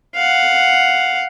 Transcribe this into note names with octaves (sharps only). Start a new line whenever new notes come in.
F5 F#5